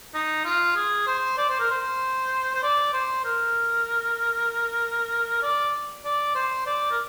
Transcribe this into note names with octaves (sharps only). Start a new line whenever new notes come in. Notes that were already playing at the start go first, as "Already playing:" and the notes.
D#4
F4
G#4
C5
D5
C5
A#4
C5
C5
D5
C5
A#4
D5
D5
C5
D5
A#4